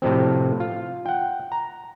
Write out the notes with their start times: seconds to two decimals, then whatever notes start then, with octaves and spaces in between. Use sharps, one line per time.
0.02 A2 C3 F3 C4
0.60 F4
1.06 F#5 G5
1.52 A#5